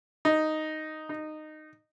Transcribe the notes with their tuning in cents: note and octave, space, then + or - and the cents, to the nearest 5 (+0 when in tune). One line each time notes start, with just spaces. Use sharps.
D#4 +0
D#4 -15